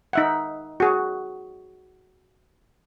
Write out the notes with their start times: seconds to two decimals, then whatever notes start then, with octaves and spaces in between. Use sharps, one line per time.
0.13 D#4 E5 F#5
0.80 F#4 G#4